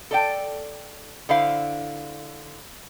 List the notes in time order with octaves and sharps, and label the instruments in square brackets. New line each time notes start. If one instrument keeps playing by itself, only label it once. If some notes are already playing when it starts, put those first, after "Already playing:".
[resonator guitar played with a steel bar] A4 D5 G5
D3 E4 C5 F5